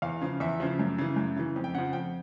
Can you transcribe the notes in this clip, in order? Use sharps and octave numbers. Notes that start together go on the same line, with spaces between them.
E2 F5
C#3 F3
E2 E5
C#3 F3
F#2
C#3 E3
F#2
C#3 E3
F2
G5
C#3 F3 F#5
F2 G5